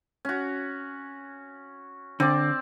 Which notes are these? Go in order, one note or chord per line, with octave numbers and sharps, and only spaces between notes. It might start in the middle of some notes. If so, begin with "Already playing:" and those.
C#4 F#4
D3 C4 D5